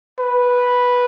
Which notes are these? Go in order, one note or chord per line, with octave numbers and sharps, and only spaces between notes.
B4